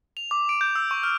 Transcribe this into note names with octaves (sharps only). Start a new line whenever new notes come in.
F7
D6
D7
G6
E6
C#6
F6